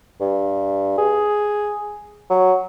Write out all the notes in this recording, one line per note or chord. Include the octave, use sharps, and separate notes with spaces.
G2
G#4
F#3